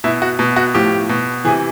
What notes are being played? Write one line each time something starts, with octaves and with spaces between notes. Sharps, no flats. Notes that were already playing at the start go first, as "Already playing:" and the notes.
B2 E4
F#4
B2
F#4
A2 F3 G4
B2
C3 E3 G#4